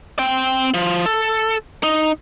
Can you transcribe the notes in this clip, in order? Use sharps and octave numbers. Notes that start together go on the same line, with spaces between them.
C4 G5
F3
A4
D#4